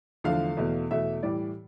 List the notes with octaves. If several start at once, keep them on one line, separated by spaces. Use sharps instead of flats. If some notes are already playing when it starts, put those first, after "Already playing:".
E2 D3 F3 A3 F5
E2 B2 A3
E2 B2 A3 E5
A2 E3 G3 D5